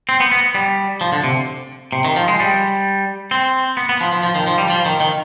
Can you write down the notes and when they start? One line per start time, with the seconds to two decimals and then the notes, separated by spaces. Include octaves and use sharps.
0.09 C4
0.20 B3
0.32 B3
0.55 G3
1.01 F3
1.12 D3
1.24 C3
1.93 C3
2.05 D#3
2.16 F3
2.28 G#3
2.40 G3
3.31 C4
3.77 B3
3.89 B3
4.01 F3
4.13 F3
4.23 F3
4.35 D#3
4.47 F3
4.58 G3
4.70 F3
4.85 D#3
5.00 D#3